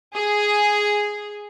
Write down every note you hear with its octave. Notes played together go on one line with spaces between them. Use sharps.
G#4